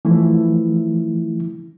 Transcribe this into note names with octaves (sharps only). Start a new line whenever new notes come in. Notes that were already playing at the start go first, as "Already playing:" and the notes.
E3 F3 A3 E4